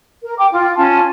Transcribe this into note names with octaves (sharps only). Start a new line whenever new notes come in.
A#4
G5 D6
F4
C#4 F4 A5